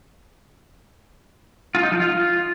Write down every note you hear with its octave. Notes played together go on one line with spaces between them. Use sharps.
F4
D#4
F3
F4